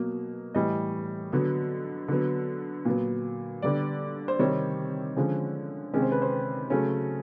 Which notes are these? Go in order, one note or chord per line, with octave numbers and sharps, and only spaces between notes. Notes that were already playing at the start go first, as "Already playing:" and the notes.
Already playing: B2 F#3 A#3
A2 E3 G3 D#5
D3 F#3 B3
D3 F#3 B3
A#2 F#3 B3
D3 G3 B3 D5
C5
C3 D#3 G3 C4 C#5
D3 F3 G#3 C#4
C3 D#3 G#3 C#4 C#5
C5
B4
C5
C#3 F#3 A3 C#4